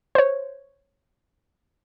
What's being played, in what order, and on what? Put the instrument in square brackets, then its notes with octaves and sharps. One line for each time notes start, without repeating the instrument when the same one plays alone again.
[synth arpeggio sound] C5 C#5